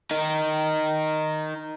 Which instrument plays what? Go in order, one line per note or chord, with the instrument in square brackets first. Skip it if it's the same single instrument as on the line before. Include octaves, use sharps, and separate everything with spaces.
[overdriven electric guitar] D#4 A#4